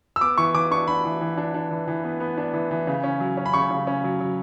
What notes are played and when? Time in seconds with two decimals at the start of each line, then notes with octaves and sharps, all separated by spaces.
0.16 E6
0.21 B3 D6
0.38 E3 C#6
0.54 E3 D6
0.71 D4 C#6
0.88 D4 B5
1.04 E3
1.21 E3
1.38 D4
1.54 D4
1.71 E3
1.88 E3
2.04 B3
2.20 B3
2.38 D4
2.53 E3
2.71 E3
2.87 C#3
3.04 C#4
3.20 F#3
3.37 C#4
3.46 B5
3.54 C#3 C#6
3.71 C#3
3.87 C#4
4.04 F#3
4.20 F#3